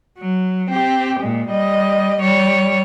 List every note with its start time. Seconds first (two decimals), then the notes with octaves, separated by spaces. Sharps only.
0.18 F#3
0.70 C4 G4
1.19 A#2 G#3
1.49 G3 D#5
2.20 G3 C#5